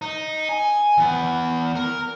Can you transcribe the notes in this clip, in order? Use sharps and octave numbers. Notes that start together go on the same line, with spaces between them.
D#4
G#5
E3 B3
A#4